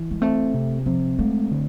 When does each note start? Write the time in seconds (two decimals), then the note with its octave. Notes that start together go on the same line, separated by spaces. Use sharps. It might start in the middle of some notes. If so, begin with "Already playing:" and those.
Already playing: E3
0.11 G#3
0.22 A3 C4
0.54 C3
0.86 F3 C4
1.19 G#3 A3
1.51 D3